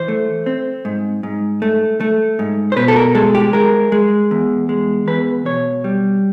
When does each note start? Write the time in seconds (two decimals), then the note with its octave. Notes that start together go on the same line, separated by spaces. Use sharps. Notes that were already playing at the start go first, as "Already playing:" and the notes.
Already playing: E3 C5
0.08 A3
0.46 C4
0.85 G#2
1.23 G#2
1.62 A3
2.00 A3
2.39 G#2
2.72 C5
2.76 B2 B4
2.88 A4
2.96 A#4
3.15 G#3 A4
3.35 G4
3.53 G#3 A#4
3.92 G#3
4.31 E2
4.69 G#3
5.07 E2 B4
5.45 B2 C#5
5.84 G3